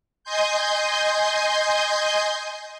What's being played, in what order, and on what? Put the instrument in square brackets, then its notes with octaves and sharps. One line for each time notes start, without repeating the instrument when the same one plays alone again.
[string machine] D#5 G#5 C6 G6